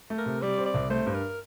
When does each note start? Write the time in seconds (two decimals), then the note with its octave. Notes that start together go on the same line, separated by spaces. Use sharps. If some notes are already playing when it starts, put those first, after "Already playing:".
0.10 A3
0.18 A#4
0.26 C3
0.42 G3 D5
0.58 C4
0.66 D5
0.74 C2
0.90 A3 C5
1.06 G2
1.15 A#4